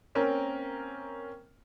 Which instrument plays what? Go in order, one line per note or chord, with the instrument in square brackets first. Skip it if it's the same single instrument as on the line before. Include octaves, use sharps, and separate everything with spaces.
[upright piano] A#3 C4 C#4 A#4